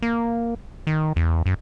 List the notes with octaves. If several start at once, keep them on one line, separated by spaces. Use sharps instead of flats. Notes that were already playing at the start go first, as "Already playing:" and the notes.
A#3
D#3
E2
F#2